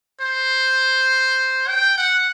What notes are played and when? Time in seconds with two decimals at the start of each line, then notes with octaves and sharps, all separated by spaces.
0.21 C5
1.68 G5
1.98 F#5